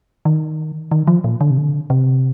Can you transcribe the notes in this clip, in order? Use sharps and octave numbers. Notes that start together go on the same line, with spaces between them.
D#3
D#3
F3
A#2
D3
C3
D3
C3